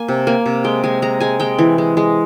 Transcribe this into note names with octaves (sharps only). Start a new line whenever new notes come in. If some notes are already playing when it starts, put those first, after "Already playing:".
Already playing: A#3 G#5
C3
A#3 G#5
C3
G#3 G5
G#3 G#5
G#3 A#5
G#3 G#5
G#3 G5
E3
G#3
G#3